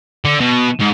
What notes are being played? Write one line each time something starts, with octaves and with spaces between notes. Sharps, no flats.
D3
B2
G#2